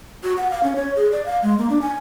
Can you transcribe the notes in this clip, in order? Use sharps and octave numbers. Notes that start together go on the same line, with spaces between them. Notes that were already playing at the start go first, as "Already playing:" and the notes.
F#4
F#5
F5
C#4
C#5
G#4
D5
F5
G#3
A#3
D4
G#5